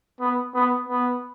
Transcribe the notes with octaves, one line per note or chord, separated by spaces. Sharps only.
B3
B3
B3